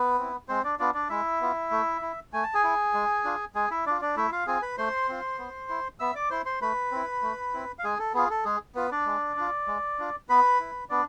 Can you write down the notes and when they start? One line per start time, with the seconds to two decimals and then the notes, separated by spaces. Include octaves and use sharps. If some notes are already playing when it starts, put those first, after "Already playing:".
Already playing: B3 B4
0.18 C4 E4
0.48 G#3 C4 C5
0.64 D4 D5
0.79 B3 D4 F4 D5
0.94 D4 D5
1.10 G#3 E4 E5
1.41 B3 F4
1.71 A3
2.01 E4
2.33 A3 G#5
2.43 A5
2.54 G#4 G#5
2.64 E4
2.94 G#3
3.24 D4 F4
3.55 G#3 G#4 G#5
3.71 E4 E5
3.86 D4 F4 D5
4.02 D4 D5
4.16 A3 E4 E5
4.31 F4 F5
4.46 C4 F4 G#4 G#5
4.62 B4 B5
4.78 A3 C5 C6
5.09 C4 F4
5.38 B3
5.69 E4
6.00 B3 E5 E6
6.15 D5 D6
6.30 E4 C5 C6
6.46 C5 C6
6.62 A3 B4 B5
6.91 C4 E4
7.22 A3
7.54 C4 E4
7.79 F5
7.84 G#3 G#4 G#5
7.99 A4
8.14 B3 F4 G#4
8.30 A4
8.45 G#3 G#4
8.75 B3 F4 B4
8.92 D4 D5
9.06 G#3
9.36 D4 F4
9.67 G#3
9.99 D4 F4
10.29 B3 B4 B5
10.60 E4
10.90 B3 D4 D5